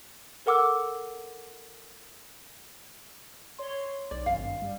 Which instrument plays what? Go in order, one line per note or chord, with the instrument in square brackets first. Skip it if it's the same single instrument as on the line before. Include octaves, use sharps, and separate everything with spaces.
[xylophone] A4 A#4 F#5 D6 E6 F6
[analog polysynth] C#5 C6
[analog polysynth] B1 [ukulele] D5
[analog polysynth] G#1 F#2 [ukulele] F5
[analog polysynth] G2
G3